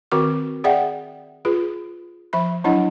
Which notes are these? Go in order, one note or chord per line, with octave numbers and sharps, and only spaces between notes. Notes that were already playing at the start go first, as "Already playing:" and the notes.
D#3 C4 F#4 A#4 D6
G#4 D5 E5 F#5 G5
F4 G#4 B4
F3 E5 B5
F#3 D4 E4 D#5 F#5